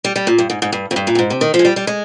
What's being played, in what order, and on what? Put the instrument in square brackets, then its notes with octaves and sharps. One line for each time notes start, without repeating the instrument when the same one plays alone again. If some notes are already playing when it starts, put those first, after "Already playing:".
[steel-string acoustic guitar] G3
G3
A#2
G2
G#2
G#2
G2
F2
G2
A#2
G2
G#2
C3
D#3
F3
G#3
G3
G3
G#3